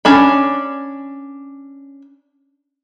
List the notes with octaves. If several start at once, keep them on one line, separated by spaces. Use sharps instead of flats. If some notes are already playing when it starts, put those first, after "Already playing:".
C#4 D4 B5